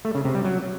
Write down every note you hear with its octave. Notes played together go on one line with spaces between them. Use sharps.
A3
C#3
C3
G3
F#3